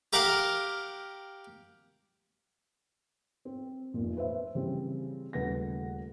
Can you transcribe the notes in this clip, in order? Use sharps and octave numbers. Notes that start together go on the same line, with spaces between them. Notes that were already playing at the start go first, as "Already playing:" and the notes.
G4 A#4 F5 F#5
C4
F1 A#2
B4 C5 E5
C#3 E3 G3 C4
D#1 C#3 A3 B4 F#5 A#6